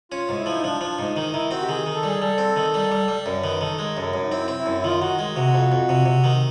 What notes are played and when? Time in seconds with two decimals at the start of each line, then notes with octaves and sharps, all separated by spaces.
0.11 C#4 F4
0.29 G#2
0.38 E4
0.46 F3
0.53 D#4
0.63 F3 D4
0.81 F3 D4
0.99 G#2 D#4
1.16 D#3 D#4
1.33 D#3 E4
1.51 C4 F#4
1.61 G4
1.68 D#3 G#4
1.86 D#3
1.94 A4
2.03 G3 G#4
2.21 G3 A4
2.38 C4
2.56 D#3
2.74 G3
2.92 G3
3.08 G3
3.26 F#2 A#4
3.43 D#3 B4
3.61 D#3 A4
3.79 G#3 A#4
3.97 F#2 A4
4.05 A#4
4.14 F#2
4.22 D#4
4.32 C4 E4
4.48 C4
4.58 E4
4.66 F#2
4.78 E4
4.84 D#3 F4
5.01 D#3 F#4
5.19 G#3
5.36 C3 F#4
5.54 F2
5.72 F2
5.89 C3
6.06 C3
6.24 D#3